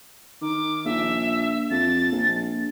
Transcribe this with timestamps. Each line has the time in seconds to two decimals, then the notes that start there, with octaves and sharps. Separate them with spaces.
0.42 D#3 D6
0.85 A#1 E5
1.70 F2 A6
2.11 A#1